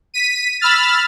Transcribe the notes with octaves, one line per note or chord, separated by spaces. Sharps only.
B6 D#7
B5 E6 F6 A6